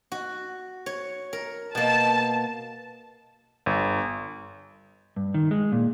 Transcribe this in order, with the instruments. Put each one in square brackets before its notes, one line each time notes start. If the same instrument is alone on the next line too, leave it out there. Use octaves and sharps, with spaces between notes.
[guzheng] F#4
C#5
A#4
[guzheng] B2 A#3 [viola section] A5
[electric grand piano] G1
[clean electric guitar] G2
D#3
G#3
A#2